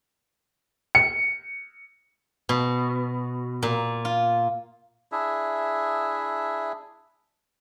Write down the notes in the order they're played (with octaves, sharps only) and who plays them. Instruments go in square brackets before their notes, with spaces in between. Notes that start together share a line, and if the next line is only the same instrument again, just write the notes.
[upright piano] C#7
[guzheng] B2
A#2
F4
[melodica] D4 E4 G#4 E5